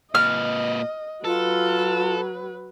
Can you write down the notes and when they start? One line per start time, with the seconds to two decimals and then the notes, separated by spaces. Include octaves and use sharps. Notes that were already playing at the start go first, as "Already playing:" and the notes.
0.15 A#2 B4 D#5 F6
1.24 F#3 F4 A4 B4